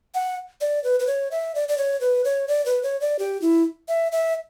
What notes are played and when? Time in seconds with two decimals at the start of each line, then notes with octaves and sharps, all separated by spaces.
0.14 F#5
0.61 D5
0.84 B4
1.00 B4
1.07 C#5
1.31 E5
1.55 D5
1.68 D5
1.78 C#5
2.01 B4
2.25 C#5
2.48 D5
2.66 B4
2.83 C#5
3.01 D5
3.19 G4
3.42 E4
3.88 E5
4.12 E5